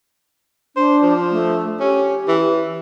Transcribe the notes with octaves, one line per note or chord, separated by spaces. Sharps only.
D4 C5
F3
A3
C#4 G4
E3